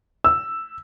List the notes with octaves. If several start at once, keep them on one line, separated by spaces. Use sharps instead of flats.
E6